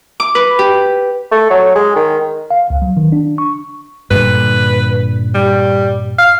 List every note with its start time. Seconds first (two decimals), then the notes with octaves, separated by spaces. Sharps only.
0.20 D6
0.35 B4
0.59 G4
1.31 A3
1.51 F#3
1.75 G#3
1.96 D#3
2.51 F5
2.70 C#2
2.82 F#3
2.97 D#3
3.12 D4
3.38 C#6
4.11 G2 A#2 D3 B4
5.35 G3
6.18 F5